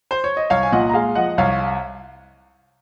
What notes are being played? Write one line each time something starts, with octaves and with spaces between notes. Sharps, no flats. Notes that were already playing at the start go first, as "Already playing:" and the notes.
C5
C#5
D#5
C2 C#5 F5
G#5
A#2 D#5 F#5
A#5
G#3 F5 G#5
F3 D#5 F#5
C2 C#5 F5